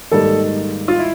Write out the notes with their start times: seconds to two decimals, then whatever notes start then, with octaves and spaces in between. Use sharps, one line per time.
0.12 G#2 D#3 G3 A#3 D#4 A4
0.88 F4
0.99 E4